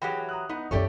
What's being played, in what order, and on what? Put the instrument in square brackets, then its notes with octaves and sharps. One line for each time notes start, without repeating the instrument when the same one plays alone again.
[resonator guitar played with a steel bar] E3 F#3 G4 [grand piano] G#4 G5
[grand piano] A#5 D#6 F#6
[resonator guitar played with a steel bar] B3 [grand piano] D#4
[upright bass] F#2 F4 [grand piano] E4 D5 [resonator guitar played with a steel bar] G4 A4 C#5